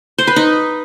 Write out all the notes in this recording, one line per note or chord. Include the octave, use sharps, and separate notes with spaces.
C5
B4
D#4